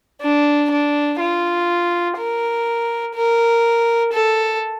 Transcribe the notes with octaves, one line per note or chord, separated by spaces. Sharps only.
D4
D4
F4
A#4
A#4
A4